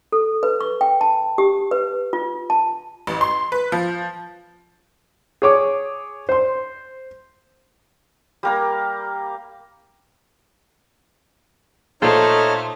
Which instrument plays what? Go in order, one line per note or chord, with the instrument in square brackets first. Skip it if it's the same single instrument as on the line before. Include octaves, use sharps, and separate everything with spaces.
[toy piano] A4
B4
C#6
G5
A5
G4
B4
F4
A5
[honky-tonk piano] A1
C6
B4
F3
[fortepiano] G#4 C#5 D6
C5 C6
[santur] G3 A#3 A#4
[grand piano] A#2 [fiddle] A3 [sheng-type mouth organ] D#4 C#5 F6 [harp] A4 C5